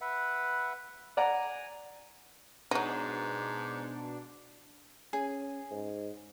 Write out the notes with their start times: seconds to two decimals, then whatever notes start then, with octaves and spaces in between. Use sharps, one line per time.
0.01 B4 E5 F#5
1.17 D5 F#5 G#5 A#5
2.71 G#2 B2 F#3 D4 D#4
5.13 C#4 G#4 G#5
5.71 G#2